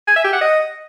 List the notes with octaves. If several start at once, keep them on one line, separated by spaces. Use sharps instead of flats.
G#5
E5
G4
F#5
D#5